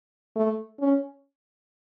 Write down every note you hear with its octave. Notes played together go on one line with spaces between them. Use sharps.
A3
C#4